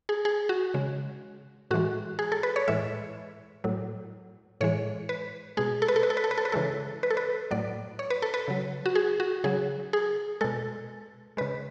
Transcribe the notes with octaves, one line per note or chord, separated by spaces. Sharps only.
G#4
G#4
F#4
C#3 G#3
A2 E3 G#3 F#4
G#4
A4
B4
C#5
A2 E3 G#3 E5
A2 F#3
A2 E3 G#3 C#5
B4
B2 G#3 G#4
A4
B4
A4
B4
A4
B4
A4
B4
A4
B4
C#3 E3 G#3 A4
B4
A4
B4
A2 F#3 D5
C#5
B4
A4
B4
C#3 F#3
F#4
G#4
F#4
C#3 F#3 G#4
G#4
B2 G#3 A4
C#3 G#3 B4